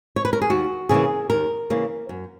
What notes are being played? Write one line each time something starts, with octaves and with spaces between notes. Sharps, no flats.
C#5
B4
A#4
G#4
D#2 F#4
C#3 E3 A#3 G#4
D#2 A#4
C#3 E3 A#3
F#2